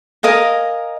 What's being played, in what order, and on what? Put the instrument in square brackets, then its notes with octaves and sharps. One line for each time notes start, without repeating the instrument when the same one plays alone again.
[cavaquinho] A#4 D#5 F5 G#5